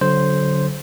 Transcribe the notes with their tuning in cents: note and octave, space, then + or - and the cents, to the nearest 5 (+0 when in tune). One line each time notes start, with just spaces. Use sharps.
D3 -25 F#3 +0 C5 +0